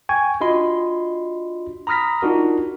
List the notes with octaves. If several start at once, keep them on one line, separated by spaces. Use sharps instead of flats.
G5 G#5 C#6 G#6
D4 F4 F#4 D#5 B5 C6
A#5 B5 D#6 F6 A#6 B6
D4 D#4 F4 F#4 A#4